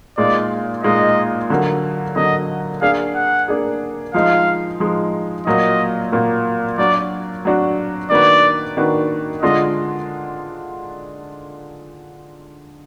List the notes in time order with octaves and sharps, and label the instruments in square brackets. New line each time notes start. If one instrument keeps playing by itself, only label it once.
[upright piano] A#2 G#3 D#4 [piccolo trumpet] D5
[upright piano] A#2 G#3 D#4 [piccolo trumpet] D#5
[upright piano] D3 F#3 A#3
[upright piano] D3 F#3 A#3 [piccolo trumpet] D#5
[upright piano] A#3 D4 G#4 [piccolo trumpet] F5
[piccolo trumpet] F#5
[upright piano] A#3 D4 G#4
[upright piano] F3 G#3 D#4 [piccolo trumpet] F5
[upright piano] F3 G#3 D#4
[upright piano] A#2 F#3 A#3 [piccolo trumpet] D#5
[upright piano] A#2 F#3 A#3
[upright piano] F#3 D4 F#4 [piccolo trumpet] D5
[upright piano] F#3 D4 F#4
[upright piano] D#3 A#3 D4 F#4 B4 [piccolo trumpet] D5
[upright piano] D#3 A#3 D4 F#4 B4
[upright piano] D3 G#3 D4 F4 [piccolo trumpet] D#5